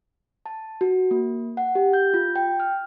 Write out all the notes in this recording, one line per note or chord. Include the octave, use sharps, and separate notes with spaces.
A5
F#4
A#3
F#5
G4
G6
F4
G5
F6